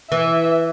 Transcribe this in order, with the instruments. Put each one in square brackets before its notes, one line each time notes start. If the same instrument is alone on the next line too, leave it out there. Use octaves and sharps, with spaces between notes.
[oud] E3 [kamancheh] E5